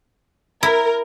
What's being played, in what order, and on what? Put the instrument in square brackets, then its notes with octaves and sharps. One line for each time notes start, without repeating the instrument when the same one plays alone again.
[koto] E4 [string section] A#4